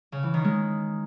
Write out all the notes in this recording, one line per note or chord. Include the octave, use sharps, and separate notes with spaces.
C#3
E3
D#3
G#3